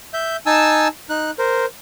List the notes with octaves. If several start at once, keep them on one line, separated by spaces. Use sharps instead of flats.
E5 G6
D#4 G#5 A5 E6
D#4 F#6
A#4 C5